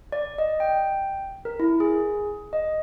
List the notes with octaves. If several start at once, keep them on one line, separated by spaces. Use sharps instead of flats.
D5
D#5
G5
A#4
E4
G#4
D#5